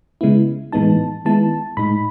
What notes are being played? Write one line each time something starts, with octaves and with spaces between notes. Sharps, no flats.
C#3 G#3 B3 E4
A2 E3 G#3 B3 D#4 A5
D#3 G#3 B3 E4 A5
A2 G#3 D#4 B5